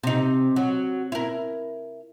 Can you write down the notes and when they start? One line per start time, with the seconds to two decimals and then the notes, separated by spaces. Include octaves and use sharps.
0.03 C3 D#4
0.56 F#3
1.12 E4 A#4